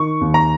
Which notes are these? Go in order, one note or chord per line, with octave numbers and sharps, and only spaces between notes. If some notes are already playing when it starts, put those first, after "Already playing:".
Already playing: D#3 C#6
D#2
A#5